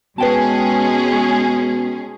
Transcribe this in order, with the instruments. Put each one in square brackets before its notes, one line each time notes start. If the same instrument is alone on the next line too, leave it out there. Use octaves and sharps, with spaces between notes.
[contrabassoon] B2 [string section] G#3 C#4 G#4 [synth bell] B4 G5 A5